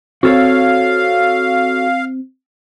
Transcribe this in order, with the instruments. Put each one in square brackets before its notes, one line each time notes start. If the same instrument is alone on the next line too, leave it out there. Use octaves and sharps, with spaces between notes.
[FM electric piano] C4 [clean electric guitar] F#4 A4 C#5 [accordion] F5